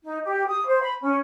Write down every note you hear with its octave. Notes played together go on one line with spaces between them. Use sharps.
D#4
G4
D#6
C5
B5
C#4